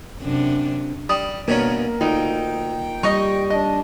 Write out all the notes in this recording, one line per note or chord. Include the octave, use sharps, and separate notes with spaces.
F#2 C3 D4
G3 D#6
G2 B2 A#3 C#4 A#4
D2 D#4 F4 G5
G3 D#4 D#5 C#6
D4 D#5